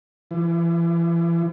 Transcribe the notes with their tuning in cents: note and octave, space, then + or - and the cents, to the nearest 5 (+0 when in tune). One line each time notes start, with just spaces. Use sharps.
E3 +40